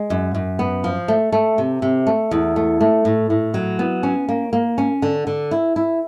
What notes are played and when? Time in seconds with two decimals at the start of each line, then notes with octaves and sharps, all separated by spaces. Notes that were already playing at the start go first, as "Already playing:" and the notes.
Already playing: G#3
0.10 F#2
0.35 F#2
0.59 B3
0.84 F3
1.08 A3
1.32 A3
1.58 C3
1.82 C3
2.07 A3
2.31 E2
2.56 A3
2.81 A3
3.05 A2
3.30 A2
3.54 F#3
3.79 B3
4.03 C#4
4.29 A#3
4.53 A#3
4.78 C#4
5.02 D3
5.27 D3
5.51 E4
5.76 E4